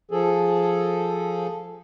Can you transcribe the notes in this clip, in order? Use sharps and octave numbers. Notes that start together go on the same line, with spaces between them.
F3 G#4 A4